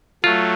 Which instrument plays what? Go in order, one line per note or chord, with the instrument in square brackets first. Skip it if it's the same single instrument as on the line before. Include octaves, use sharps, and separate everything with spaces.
[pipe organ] F#3 A3 [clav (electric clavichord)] F4